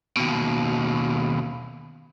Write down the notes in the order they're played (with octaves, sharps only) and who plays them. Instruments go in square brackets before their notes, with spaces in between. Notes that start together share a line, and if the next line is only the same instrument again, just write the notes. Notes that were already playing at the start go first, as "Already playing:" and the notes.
[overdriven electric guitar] D#2 B2